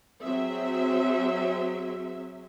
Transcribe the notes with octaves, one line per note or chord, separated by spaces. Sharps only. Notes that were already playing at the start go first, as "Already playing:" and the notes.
F#3 C4 G#4 E5